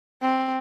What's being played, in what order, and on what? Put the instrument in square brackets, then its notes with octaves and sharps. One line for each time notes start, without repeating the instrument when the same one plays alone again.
[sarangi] C4